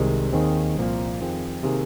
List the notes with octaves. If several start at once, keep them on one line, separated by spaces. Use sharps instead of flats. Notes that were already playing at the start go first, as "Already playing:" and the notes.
Already playing: C2 C3 D#3 G#3
D#2 D#3 C4 G#4
C2 A#2 F3 A#3
F2 D#3 C4 F4 G#4
C3 D#3 A#3 D#4 G#4